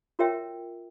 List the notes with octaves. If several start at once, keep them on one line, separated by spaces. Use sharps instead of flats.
F4 F#4 A#4 C#5 E5 G5